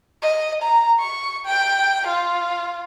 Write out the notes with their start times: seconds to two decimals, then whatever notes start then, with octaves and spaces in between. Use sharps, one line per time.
0.22 D#5
0.63 A#5
1.00 C#6
1.46 G5
2.08 F4